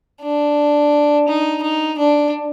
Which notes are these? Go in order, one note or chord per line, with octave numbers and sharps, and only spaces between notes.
D4
D#4
D#4
D4